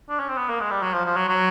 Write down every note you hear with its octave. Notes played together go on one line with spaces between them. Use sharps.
D4
C#4
C4
B3
A#3
G#3
G3
F#3
F3
F3
F#3
F#3